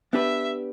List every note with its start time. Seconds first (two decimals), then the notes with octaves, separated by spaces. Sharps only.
0.13 B3 D4 G4 B4 E5